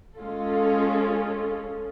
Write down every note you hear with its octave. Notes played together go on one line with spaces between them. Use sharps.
G#3 C#4 F4 A4